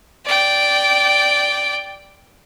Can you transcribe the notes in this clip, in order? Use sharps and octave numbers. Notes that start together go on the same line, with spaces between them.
D5 G5